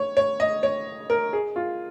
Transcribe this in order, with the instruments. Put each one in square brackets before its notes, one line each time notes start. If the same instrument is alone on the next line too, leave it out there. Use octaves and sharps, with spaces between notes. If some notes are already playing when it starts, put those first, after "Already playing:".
Already playing: [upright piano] C#5
C#5
D#5
C#5
A#4
G#4
F4